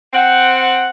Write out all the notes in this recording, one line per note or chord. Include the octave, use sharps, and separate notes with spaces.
C4 F#5